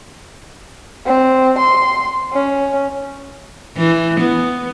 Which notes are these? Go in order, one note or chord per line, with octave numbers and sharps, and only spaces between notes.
C4
C6
C#4
E3
B3